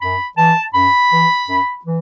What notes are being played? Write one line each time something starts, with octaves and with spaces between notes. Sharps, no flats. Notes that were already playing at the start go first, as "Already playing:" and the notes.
F#2 B5
E3 A5
F#2 B5
E3
F#2
E3